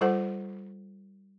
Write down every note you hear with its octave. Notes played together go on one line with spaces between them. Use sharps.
G3 F4 A4 C5 F#5